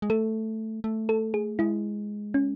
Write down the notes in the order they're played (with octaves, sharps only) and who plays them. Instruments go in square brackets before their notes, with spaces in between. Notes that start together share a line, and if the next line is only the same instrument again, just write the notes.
[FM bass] G#3
[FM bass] A3 [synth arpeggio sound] A4
[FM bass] A3
[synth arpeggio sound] A4
G#4
[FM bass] G#3 [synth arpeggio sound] E4
[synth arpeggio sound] C#4